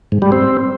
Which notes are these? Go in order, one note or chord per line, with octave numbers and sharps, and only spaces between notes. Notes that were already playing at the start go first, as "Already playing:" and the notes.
G#2
G3
C4